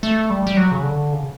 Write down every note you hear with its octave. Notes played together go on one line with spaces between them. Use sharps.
A3
G3
G3
F#3
C#3
D3
C#3